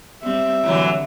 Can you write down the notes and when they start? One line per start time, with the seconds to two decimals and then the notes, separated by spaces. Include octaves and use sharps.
0.22 G3 C4 E5
0.64 A2 D3 E3 F#3